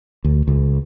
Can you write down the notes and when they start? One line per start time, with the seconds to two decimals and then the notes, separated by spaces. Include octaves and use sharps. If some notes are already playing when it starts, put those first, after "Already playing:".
0.24 D2
0.48 C#2